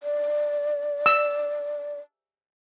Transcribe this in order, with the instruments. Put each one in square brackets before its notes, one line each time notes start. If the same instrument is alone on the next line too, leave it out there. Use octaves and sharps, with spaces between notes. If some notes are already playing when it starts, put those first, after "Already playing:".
[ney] D5
[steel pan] E6